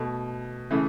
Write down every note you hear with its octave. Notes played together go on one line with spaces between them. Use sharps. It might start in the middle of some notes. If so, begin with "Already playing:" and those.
Already playing: B2 A3
C#3 E3 A3